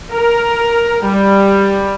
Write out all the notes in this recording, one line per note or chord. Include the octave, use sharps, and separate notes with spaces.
A#4
G3